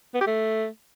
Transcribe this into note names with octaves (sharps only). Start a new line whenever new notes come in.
B3
G4
A3